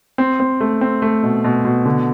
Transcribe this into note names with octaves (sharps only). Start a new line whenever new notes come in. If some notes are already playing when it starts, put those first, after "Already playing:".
C4
C4
A3
C4
A3
B2
B2
B2
D3